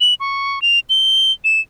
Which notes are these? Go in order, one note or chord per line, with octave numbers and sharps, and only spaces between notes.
F#7
C#6
F7
G7
E7